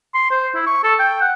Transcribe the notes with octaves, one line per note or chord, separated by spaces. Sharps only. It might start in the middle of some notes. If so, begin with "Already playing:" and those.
C6
C5
E4
C#6
A4
G5
F#5